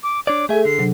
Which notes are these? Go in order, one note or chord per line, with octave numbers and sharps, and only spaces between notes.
D6
D4 C#5 D5 D6
A3 G#4 A4 E5 G#5
D3 C7
C3 F#3 D4